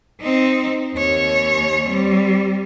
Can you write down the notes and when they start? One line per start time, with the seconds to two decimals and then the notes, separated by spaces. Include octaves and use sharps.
0.21 C4 D#4
0.95 D#2 C#5
1.88 G3 C4